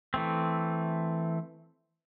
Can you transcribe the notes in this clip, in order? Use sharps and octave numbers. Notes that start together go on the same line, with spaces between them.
E3 A3 C4